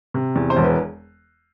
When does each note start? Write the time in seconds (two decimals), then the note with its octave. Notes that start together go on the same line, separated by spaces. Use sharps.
0.14 C3
0.36 E2
0.50 C5
0.56 E1
0.64 B4